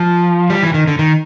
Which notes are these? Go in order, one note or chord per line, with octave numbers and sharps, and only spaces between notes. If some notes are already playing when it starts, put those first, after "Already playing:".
Already playing: F3
G3
E3
D#3
D3
D#3